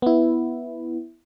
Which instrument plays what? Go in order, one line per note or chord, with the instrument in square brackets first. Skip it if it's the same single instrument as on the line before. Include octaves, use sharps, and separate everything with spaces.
[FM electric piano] B3 E4